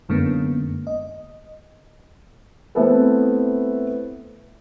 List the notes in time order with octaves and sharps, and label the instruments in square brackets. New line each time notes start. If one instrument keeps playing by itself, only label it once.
[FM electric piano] F#2 D3 G#3 A#3 B3 C#4
D#5
[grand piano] A3 B3 C4 E4 A4 B4